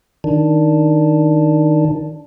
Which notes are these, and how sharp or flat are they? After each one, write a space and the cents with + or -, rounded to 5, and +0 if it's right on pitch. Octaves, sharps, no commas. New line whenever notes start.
D#3 +0 D4 +0